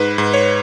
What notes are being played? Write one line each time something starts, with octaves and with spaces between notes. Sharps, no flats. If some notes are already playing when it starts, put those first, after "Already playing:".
Already playing: G#2 B4
G#2
C#5